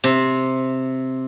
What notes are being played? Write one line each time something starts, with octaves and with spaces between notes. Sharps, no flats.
C3